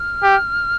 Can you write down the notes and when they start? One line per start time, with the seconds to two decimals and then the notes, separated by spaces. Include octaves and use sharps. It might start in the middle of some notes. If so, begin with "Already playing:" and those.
Already playing: F6
0.23 G4